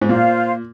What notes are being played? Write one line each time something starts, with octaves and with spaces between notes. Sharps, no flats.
G#2
A#2 F4 C5 F5